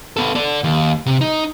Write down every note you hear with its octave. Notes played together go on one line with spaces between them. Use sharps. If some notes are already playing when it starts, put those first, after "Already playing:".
B3 A4
A4 D5
D#2
C3
D#4